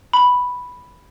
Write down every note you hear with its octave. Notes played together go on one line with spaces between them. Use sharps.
B5